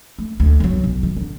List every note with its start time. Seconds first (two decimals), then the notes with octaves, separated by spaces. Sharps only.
0.19 A3
0.40 D2
0.60 G1 F#3
0.84 B1
1.03 D#3
1.17 D3